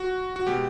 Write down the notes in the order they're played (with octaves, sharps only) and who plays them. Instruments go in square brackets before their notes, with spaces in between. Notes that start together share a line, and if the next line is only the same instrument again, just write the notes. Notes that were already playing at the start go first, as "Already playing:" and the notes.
Already playing: [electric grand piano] F#4
F#4
B2 G#3 G4